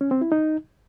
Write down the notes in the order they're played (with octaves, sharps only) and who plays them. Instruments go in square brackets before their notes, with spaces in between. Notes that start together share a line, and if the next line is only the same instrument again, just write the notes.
[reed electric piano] C#4
C4
E4
D#4